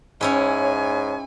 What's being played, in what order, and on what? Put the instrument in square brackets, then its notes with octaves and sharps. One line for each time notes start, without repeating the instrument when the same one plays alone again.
[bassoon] G#2 [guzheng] C#4 E4 G5 [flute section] C#5 [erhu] G#5